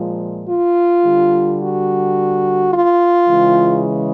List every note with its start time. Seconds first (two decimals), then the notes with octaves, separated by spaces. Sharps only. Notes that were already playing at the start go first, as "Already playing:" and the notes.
Already playing: A#2 F3 G#3
0.49 F4
1.04 D3 G3
1.60 F#4
2.72 F4
3.28 C#3 E3 G#3